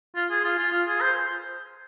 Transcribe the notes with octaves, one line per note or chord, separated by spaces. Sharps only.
F4
G#4
F4
F4
F4
G#4
C5